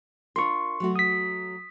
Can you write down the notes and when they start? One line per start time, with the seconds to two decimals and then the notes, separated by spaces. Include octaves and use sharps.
0.36 D4 F4 A#4 C6 C#6
0.80 F#3 A3 F#4
0.96 D#6 B6